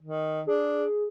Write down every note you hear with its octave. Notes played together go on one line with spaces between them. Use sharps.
D#3
D4 G#4